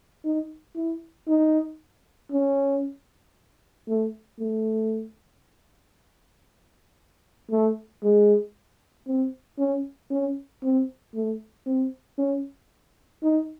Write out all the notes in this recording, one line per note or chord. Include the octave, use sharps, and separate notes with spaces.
D#4
E4
D#4
C#4
A3
A3
A3
G#3
C4
C#4
C#4
C4
A3
C4
C#4
D#4